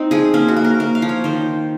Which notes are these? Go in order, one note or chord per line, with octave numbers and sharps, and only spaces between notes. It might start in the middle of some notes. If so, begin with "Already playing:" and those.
Already playing: C4 D#4
F3 G#4
A#3 C#4
F#4
A#3
A#4
A#3
F5
F3
C#5
D#3 C5